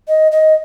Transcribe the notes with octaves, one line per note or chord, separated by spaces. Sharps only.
D#5
D#5